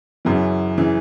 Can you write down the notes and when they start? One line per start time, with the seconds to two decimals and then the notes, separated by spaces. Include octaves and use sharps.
0.25 F#2 C#3 E3
0.77 C#3 E3